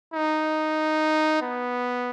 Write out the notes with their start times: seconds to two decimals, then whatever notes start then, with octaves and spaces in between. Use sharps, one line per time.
0.14 D#4
1.41 B3